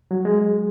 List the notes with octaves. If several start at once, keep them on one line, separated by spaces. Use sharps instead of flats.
F#3
G#3